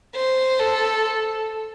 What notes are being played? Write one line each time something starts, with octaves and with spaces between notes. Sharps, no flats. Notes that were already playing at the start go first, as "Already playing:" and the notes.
C5
A4